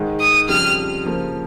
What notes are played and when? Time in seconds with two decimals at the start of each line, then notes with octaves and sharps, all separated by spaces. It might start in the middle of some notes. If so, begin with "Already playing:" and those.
Already playing: G#2 D#3 G#3
0.21 D#6
0.49 F2 C#3 G3 F6
1.05 C#3 F3 A#3